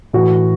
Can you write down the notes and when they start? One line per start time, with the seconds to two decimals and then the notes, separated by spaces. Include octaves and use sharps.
0.13 A2 E3 F#4